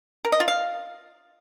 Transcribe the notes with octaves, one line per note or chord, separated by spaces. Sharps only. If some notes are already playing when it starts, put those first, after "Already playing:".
A#4
D#5
F4
F5